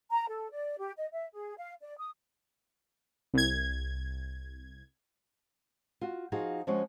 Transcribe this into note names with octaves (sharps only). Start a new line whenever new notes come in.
A#5
A4
D5
G4
D#5
E5
G#4
F5
D5
D#6
C2 G#6
F4 F#4
F3 D#4 F4 F#4 G#4 F5
F3 G#3 C#4 F#4